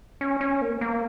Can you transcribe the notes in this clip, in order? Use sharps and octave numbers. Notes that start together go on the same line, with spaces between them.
C#4
C#4
A#3
A#3